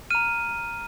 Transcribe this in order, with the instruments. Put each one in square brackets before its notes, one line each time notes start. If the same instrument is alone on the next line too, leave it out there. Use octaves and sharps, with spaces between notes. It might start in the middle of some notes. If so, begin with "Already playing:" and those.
[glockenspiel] A#5 F6 D#7